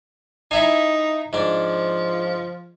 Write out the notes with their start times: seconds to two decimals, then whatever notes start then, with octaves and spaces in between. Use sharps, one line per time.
0.51 D#4 E4 E5 G#5
1.33 G#2 F3 D4